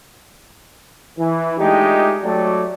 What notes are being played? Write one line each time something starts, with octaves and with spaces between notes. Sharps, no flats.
E3
G#3 A3 D4 D#4 F4 G4
F#3 A3 D5